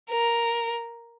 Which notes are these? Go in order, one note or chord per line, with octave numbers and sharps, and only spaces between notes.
A#4